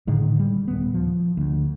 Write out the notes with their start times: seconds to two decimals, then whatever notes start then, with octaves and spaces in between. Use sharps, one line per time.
0.07 A2 D3 D#3 G#3
0.39 G3
0.68 D#1 B3
0.94 F3
1.37 D2